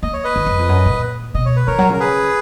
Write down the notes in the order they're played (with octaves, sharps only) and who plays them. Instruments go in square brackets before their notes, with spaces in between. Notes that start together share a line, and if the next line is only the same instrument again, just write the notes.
[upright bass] A#3 [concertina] D#5
[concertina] C#5
B4 D#5
[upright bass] D#3
F#2
F2
F#2
A#2
[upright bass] B2 [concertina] D#5
[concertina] C#5
B4
[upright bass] D#3 [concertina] A#4 C#5
[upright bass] F#3
[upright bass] C#3 [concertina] A#4
[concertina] G#4 B4